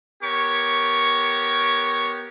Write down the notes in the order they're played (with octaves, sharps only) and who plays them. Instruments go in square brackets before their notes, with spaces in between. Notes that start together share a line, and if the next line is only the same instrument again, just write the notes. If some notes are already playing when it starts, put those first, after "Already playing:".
[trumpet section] B3 G4 A#4 C#5 C#6